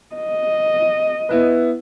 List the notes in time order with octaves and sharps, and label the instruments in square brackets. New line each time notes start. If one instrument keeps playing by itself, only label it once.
[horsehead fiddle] D#5
[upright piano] B3 E4 B4